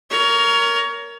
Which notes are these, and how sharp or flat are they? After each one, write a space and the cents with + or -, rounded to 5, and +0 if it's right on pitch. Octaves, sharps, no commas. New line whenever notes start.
A#4 +0 C#5 +25